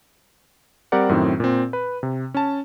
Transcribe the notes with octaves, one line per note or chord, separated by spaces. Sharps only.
G3 C4 G4 A#4 D5 F#5
F#2 A2 D#3 C4
A#2 C4
B4
C3
C#4 A5